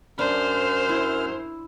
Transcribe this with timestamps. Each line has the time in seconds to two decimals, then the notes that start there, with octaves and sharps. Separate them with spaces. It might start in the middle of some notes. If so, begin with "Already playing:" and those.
0.19 F#2 D4 C5 F6
0.89 E4